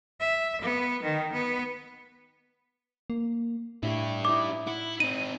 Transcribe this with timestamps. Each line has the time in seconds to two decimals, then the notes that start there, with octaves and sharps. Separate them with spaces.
0.20 E5
0.61 B3
1.03 D#3
1.32 B3
3.10 A#3
3.83 A2 D4 E4 G4 C#5
4.25 D#4 E4 D6
4.67 E4 F#5
5.00 C4 D#4 D#7